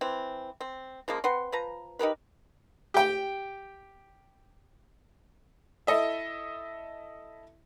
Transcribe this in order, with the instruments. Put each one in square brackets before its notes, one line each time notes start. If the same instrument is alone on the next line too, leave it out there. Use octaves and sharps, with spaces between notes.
[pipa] E3 C4
C4
C#3 F3 G#3 A#3
C4 B4 F#5 C6
F3 B4 A#5
D#4 G4 A#4 B4
[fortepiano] G4 G5
[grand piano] E4 A4 D#5 E5